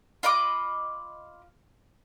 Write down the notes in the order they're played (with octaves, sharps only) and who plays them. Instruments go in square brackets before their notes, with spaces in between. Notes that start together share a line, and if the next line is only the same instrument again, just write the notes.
[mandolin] F4 D#5 B5 D6